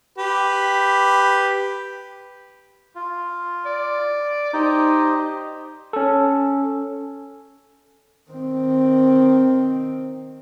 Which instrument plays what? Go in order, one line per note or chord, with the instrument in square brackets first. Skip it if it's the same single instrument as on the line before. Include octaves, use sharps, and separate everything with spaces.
[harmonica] G4 B4
[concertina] F4
[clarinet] D5
[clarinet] D#4 [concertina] G4 C5 D#5
[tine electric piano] C#4 A4
[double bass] D#3 C4